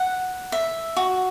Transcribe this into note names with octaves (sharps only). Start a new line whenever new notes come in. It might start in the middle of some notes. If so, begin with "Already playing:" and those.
Already playing: F#5
E5
F#4